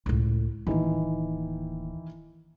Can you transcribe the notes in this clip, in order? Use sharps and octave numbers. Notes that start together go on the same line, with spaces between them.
C#2 A2
D1 D#3 E3 A#3